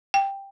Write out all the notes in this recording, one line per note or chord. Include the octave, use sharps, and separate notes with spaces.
G5